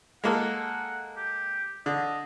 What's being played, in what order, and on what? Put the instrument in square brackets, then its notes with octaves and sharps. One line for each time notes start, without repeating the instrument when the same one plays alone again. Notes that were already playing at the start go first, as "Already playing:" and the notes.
[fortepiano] G#3 A#3 A4 [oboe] F#5
[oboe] G4
[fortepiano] D3 [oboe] D#5